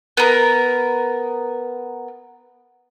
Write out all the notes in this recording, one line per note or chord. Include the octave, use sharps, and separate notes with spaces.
B3 A#4